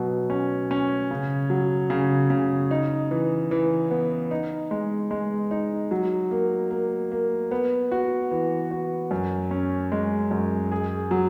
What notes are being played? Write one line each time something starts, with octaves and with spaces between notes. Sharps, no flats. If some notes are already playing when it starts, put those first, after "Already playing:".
Already playing: B2 F#3
C#4
C#4
C#3
F#3
C#3
C#3
D#4
E3
E3
B3
D#4
G#3
G#3
D#4
F#3
A#3
A#3
A#3
B3
F#4
E3
F#4
F#2
C#4
G#3
F#2
G#4
F#3